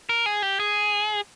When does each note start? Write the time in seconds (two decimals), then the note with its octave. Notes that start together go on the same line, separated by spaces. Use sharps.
0.09 A#4
0.26 G#4
0.42 G4
0.60 G#4